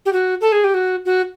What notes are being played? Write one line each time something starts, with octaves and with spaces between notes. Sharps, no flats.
G4
F#4
A4
G#4
G4
F#4
F#4